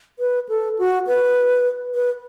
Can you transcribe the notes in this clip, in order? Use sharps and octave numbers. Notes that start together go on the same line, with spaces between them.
B4
A4
F#4
B4
B4